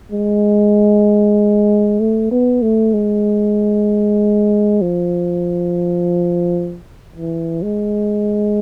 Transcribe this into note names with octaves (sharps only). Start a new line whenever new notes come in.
G#3
A3
B3
A3
G#3
F3
E3
G#3